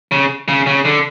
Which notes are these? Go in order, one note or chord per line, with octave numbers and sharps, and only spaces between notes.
C#3
C#3
C#3
D3